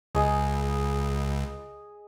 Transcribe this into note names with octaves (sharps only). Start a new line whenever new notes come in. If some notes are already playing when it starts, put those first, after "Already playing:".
C#2 G#4 D#5